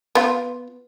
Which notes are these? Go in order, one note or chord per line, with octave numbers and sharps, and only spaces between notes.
B3 F4